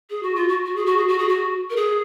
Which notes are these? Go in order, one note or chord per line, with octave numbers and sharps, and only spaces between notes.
G#4
F#4
F4
F#4
F#4
G#4
F#4
G#4
F#4
G#4
F#4
A#4
G#4